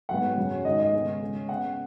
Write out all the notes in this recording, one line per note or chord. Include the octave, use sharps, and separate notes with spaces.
G#2 F#3 B3 F#5
F#2 C#3 F#3 C#4
G#2 D#3 G#3 C#4 D#5
D#5
C#3 G#3 B3
C#3 G#3 C#4
C#3 B3 F#5